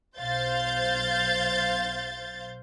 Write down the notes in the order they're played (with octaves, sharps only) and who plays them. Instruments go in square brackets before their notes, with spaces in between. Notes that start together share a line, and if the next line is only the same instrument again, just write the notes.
[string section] B1 C5 F5 G6 A6